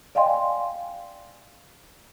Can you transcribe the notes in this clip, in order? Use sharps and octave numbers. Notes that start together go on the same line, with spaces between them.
D5 D#5 F5 G5 G#5 C6